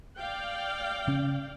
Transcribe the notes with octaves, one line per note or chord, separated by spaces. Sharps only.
D5 F5 G5
C#3 C#4